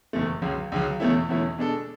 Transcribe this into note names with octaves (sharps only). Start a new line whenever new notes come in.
F#1 E2 B2 A3
C#2 C#3 F#3
C#2 C#3 F#3
E2 B2 A3 C#4 E4
E2 B2 A3 C#4 E4
B2 G#3 D4 A4